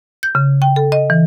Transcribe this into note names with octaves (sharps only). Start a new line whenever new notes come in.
G6
C#3
G5
A4
D#5
E3